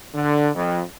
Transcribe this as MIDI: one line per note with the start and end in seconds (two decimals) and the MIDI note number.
0.15 0.49 50
0.55 0.81 41